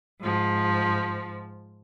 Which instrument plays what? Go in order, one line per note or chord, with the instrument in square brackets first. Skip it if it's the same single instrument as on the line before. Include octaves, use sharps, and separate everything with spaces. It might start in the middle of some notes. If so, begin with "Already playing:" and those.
[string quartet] G#2 F3